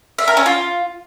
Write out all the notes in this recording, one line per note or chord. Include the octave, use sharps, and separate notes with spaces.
E5
A#4
C#4
F4